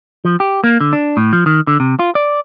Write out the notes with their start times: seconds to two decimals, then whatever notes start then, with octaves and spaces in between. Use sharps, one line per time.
0.25 F3
0.40 G4
0.64 A#3
0.80 D3
0.93 D4
1.17 A2
1.33 F3
1.46 D#3
1.67 D3
1.80 C3
1.99 F4
2.15 D5